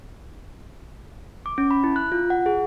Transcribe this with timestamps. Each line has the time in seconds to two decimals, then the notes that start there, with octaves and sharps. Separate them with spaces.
1.46 D6
1.58 C#4
1.71 B5
1.84 E4
1.96 F#6
2.12 F4
2.30 F#5
2.46 G#4